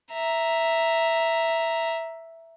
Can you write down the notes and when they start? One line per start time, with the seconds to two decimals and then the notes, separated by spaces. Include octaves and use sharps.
0.12 E5 A#5